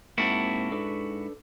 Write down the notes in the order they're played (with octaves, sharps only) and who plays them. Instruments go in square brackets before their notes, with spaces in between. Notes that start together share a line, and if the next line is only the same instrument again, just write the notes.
[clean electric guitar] G#2 E4 F#4 [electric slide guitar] A#3 C4 A5
[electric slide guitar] D4 A4 B4